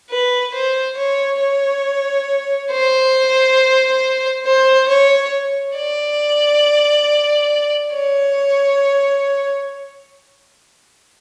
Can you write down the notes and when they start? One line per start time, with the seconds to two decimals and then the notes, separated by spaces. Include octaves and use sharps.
0.10 B4
0.54 C5
0.97 C#5
1.40 C#5
2.71 C5
4.45 C5
4.88 C#5
5.76 D5
7.93 C#5